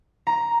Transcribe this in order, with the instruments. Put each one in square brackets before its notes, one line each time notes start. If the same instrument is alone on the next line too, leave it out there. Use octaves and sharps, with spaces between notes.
[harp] A#5